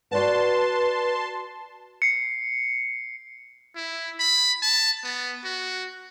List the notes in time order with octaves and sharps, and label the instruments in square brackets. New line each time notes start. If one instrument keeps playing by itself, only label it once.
[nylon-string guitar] F#4 D5 F#5 [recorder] B4 [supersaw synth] A5 C6
[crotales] C7 C#7
[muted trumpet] E4
B5
A5
B3
F#4